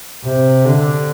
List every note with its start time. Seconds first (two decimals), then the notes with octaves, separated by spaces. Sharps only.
0.25 C3
0.65 D3